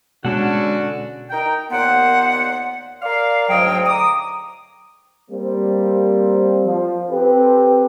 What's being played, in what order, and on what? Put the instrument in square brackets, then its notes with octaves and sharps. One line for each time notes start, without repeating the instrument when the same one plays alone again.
[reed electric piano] B2 G#3 [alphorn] D3 [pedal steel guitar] C#4 A4 F#5 [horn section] D4 F#4
[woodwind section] D#4 A#4 G5
D#2 A#2 B3 C5 F#5
A#4 D5 F5
D2 G#2 F#3 D#5 G5
A#5 D6 D#6
[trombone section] G3 A#3 C4
F3
C4 G4 A4 B4